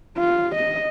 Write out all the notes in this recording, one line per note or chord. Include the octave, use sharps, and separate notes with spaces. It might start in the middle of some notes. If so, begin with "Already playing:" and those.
F4
D#5